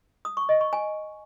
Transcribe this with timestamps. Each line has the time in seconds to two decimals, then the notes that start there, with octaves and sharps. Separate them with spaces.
0.25 D#6
0.37 C#6
0.49 D#5
0.61 C#6
0.73 G#5